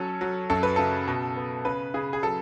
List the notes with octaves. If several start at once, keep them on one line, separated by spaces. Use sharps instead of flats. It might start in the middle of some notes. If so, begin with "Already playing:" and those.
Already playing: F#3 C#4 A4
F#3
F#2 A4
B4
C#3 A4
B2
B3
C#3 B4
C#3 G#4
G#4
F#3 A4